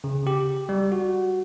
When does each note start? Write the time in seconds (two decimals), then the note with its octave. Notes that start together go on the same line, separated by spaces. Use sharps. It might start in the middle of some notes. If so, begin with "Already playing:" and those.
0.04 C#3
0.27 G4
0.69 G3
0.92 F#4